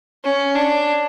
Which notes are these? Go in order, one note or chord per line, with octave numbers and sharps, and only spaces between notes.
C#4
D4